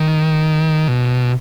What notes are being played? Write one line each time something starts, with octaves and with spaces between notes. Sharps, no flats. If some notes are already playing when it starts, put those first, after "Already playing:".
Already playing: D#3
B2